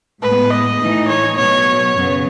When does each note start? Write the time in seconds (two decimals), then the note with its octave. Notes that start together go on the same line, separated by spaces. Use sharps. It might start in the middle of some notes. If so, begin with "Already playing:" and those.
0.22 A2 G#3 B3 B4
0.50 D#5
0.79 A2 E3 A3 D#4
1.07 C#5
1.36 B2 F#3 B3 C#5
1.93 F#2 C#3 F#3 B3